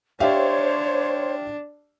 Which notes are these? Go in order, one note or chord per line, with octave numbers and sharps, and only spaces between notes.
D4 G4 C5 C#5 E5 F5